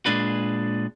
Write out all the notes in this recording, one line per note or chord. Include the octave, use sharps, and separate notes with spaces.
A#2 G#3 D4 B4